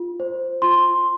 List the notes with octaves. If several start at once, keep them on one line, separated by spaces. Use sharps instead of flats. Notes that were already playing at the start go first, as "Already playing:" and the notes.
Already playing: F4
C5
F4 C6